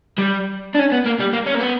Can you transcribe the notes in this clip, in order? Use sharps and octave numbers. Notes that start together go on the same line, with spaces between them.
G3
D4
C#4
B3
A#3
G3
A#3
C#4
A#3
B3